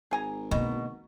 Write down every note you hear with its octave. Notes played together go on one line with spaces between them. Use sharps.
G#1 G#4 G#5 A#5
B2 D3 A#3